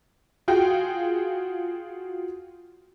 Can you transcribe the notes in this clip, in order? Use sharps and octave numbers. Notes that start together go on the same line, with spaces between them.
F4 F#4 G#4 G5